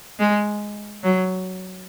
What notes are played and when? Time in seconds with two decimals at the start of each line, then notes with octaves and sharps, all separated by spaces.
0.20 G#3
1.04 F#3